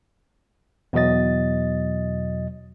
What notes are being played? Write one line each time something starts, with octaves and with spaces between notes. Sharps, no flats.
E2 B2 F#3 D#5 A6